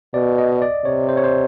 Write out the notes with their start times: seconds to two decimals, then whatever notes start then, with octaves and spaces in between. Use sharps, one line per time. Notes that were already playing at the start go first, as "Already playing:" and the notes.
0.14 B2 D5
0.38 D#5
0.62 D5
0.85 C3 C#5
1.09 C5
1.17 C#5
1.24 C5